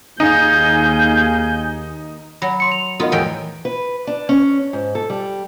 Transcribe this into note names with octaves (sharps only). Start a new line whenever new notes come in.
D#2 D#4 G#4 F5 G#5 G6
F#3 B5
C6 C#7
F7
B3 D#4 F4 F#4 A#4 D#5
E2 A2 G5
B4
D4
C#4
G#2
A4
G3